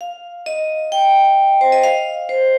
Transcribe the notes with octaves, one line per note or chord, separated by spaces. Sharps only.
F5
D#5
G5
C5
D#5
F5
C5